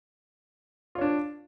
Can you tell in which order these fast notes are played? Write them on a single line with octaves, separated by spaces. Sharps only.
F4 C#5 D4